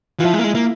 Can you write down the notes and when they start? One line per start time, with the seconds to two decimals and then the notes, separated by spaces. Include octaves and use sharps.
0.19 E3 F4
0.24 F3 E4
0.34 G#3
0.39 A#3
0.44 G#3
0.55 A#3